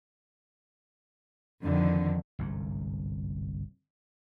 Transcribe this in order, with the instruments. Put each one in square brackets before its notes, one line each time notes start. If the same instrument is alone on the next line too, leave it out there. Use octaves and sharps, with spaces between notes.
[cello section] F2 D3 D#3
[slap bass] G1 C2 G#2